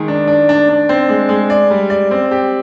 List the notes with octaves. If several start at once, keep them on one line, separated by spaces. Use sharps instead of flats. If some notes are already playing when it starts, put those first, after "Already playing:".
Already playing: D#3 G#3
D4
D4
D4
D4
C4
G#3
G#3
D5
G3
D5
C4
G4